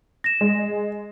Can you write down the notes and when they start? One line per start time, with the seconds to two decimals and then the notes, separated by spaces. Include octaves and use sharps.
0.24 A#6 E7
0.41 G#3